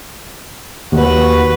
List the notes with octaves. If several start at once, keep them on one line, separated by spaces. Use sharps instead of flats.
D#2 F#4 B4